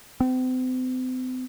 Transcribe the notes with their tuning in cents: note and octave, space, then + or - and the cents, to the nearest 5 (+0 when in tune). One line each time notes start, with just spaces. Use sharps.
C4 -40